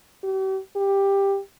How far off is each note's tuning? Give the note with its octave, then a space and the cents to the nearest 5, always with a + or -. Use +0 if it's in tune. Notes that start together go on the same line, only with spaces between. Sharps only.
G4 -40
G4 +10